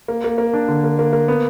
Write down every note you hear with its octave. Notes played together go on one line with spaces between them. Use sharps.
A#3
A#3
A#3
D4
D3
A#3
A#3
A#3
B3